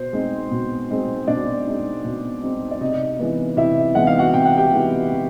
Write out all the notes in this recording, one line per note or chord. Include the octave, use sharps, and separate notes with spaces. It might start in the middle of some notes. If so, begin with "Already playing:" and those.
Already playing: B2 C5
G#3 C4 D#4
B2
G#3 C4 D#4
B2 D4 D5
G#3 C4 D#4
B2
G#3 C4 D#4
D5
C3 D#4 D#5
E3 G#3 B3 D#4
C3 E4 E5
E3 G#3 B3 D#4 F#5
F5
F#4 F#5
C3 G5
F#5
G4 G5
E3 G#3 B3 D#4
C3